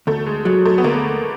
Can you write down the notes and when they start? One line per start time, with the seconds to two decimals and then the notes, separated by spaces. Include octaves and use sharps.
0.07 D2 A3
0.26 G#3
0.45 F#3 G#3
0.65 A3
0.78 B3
0.84 D2 A#3